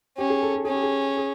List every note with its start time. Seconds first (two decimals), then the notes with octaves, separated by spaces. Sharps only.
0.18 C#4 G4
0.30 G#4
0.42 A4
0.55 A4
0.65 C#4 G#4
0.74 G4
0.83 G#4
1.17 G#4